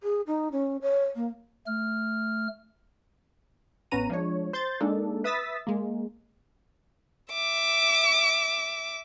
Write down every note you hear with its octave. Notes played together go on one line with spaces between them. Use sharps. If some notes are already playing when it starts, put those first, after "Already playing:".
G#4
D#4
C#4
C#5
A#3
A3 F6
A1 B3 C#4 B4 A#5 D#7
F3 G#3 D4 C#5
C5 C6 G6 A6
G#3 A#3 D4 D#4 A4
B4 E5 D#6 E6 A6 B6
G#3 A#3
E5 D6